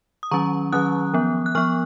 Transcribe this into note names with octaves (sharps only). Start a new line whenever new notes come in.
D#6
D#3 F#3 C#4 A#5 C#6
D#3 F#3 C#4 D#6 F#6
F3 B3
F#6
F3 B3 C#6 F6